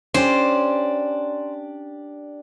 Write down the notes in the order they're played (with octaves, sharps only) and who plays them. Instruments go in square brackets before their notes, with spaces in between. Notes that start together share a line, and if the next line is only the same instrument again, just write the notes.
[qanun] C#4 [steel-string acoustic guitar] D4 G4 [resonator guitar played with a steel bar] C5